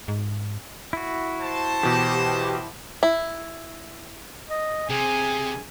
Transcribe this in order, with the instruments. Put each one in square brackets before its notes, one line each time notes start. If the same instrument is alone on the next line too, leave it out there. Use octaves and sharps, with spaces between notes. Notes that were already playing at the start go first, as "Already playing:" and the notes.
[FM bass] G#2
[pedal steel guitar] E4 F#4
[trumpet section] C5 A5
[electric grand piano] B2 E3 [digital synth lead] G4
[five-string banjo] E4
[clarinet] D#5
[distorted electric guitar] C3 [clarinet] G#4 [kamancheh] G#5